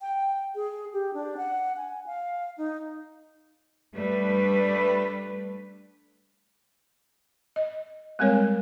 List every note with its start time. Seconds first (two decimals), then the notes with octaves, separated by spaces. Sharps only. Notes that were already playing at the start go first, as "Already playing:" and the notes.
0.01 G5
0.56 G#4
0.93 G4
1.14 D4
1.37 F#5
1.77 G#5
2.06 F5
2.58 D#4
3.95 G3 A3 D4 B4
7.56 D#5
8.19 G3 G#3 C4 A#4 C#5